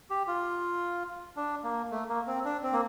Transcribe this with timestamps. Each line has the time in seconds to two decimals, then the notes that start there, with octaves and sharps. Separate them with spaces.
0.10 G4
0.27 F4
1.36 D4
1.63 A#3
1.91 A3
2.09 A#3
2.27 C4
2.45 D4
2.63 C4
2.73 A#3